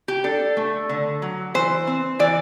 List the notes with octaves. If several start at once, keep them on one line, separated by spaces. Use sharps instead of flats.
G4
D4 A4
A3
D3
F#3
E3 C5
C4
E3 D5